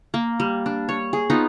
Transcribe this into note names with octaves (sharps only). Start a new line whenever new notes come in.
A#3
G3
D4
C#5
G#4
B3 D#4 F4